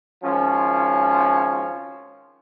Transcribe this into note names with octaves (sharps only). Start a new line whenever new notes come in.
G#1 F3 C#4